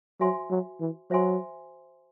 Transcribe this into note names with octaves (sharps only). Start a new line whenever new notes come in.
F#3 F#4 C5 E5 G#5 C6
F#3
E3
F#3 F#4 C5 E5 G#5 C6